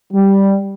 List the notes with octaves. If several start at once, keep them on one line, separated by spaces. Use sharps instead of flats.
G3